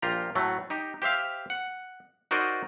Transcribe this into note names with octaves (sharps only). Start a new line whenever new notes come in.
A#1 F4 G4 A#5
A2 F#3 A3
D#4 G4
G4 C5 E5 F5
F#5
D#4 F#4 A#4 C5 D5 D#5